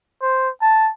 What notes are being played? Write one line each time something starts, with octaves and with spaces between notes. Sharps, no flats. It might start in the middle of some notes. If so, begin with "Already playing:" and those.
C5
A5